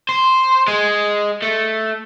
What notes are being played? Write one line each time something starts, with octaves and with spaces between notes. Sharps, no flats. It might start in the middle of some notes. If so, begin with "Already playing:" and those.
C5
G#3
A3